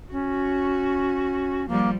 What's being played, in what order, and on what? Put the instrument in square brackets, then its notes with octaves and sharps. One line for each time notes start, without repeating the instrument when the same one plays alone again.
[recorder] C#4 [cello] F#4
[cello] F3 G3 [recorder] A#3